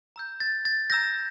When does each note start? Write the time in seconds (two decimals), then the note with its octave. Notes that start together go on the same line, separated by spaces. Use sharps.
0.16 A#5 E6 G6
0.40 A6
0.65 A6
0.90 A#5 E6 G6 A#6